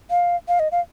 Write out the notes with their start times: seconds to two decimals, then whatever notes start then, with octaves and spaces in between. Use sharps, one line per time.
0.10 F5
0.48 F5
0.60 D#5
0.72 F5